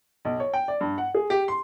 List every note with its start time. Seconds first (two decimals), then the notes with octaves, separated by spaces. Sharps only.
0.25 B1
0.40 C#5
0.54 G5
0.68 D5
0.81 G2
0.98 F#5
1.15 G#4
1.30 G4
1.48 C6